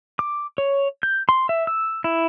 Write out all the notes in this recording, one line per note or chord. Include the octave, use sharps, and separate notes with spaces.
D6
C#5
G6
C6
E5
E6
E4